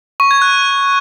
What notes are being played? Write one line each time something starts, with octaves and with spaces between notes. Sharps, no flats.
C#6
G#6
F#6